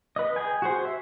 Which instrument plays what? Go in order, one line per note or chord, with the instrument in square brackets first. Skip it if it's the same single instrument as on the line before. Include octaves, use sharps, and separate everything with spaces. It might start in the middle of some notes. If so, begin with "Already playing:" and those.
[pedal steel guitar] B4 D#5
G#4 G5 G#5
F#4 G#4 C5
E5